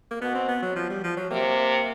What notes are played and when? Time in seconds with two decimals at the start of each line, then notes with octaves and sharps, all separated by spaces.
0.11 A#3
0.21 B2 B3
0.35 C4
0.48 B3
0.62 F#3
0.76 F3
0.90 G3
1.04 F3
1.17 F#3
1.31 C3 A#3